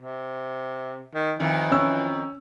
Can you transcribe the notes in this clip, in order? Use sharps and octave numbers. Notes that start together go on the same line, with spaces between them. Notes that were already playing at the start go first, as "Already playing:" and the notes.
C3
D#3
F2 D#3 E3 E4
C#4 E6